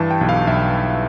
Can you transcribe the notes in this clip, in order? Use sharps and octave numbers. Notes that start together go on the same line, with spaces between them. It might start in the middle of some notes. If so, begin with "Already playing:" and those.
Already playing: G2 E3 A5
G5
B1
F5
B1 E5